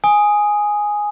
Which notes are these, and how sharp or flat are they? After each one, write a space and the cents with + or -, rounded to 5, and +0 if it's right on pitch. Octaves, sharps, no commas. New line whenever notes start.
G#5 +0 D#6 +0